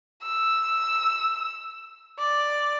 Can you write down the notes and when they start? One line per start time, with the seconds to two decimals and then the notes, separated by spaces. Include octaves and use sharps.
0.23 E6
2.19 D5